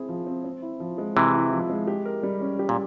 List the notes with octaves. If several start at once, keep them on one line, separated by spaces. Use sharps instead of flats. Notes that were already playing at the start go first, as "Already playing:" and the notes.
Already playing: C4 E4 G#4
F3
C4
C4
E4
F3
G#3
C3 E3 C4
E4
F3
G#3
G4
A#4
G3
C#4
G4
A#2